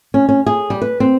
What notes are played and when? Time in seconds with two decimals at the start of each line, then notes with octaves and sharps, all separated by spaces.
0.14 C#4
0.29 C#4
0.46 G#4
0.70 G3
0.82 B4
1.00 C4